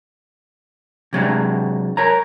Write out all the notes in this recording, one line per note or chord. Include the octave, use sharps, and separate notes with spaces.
C3 F#3 G#3 D4
A#4 C#5 A#5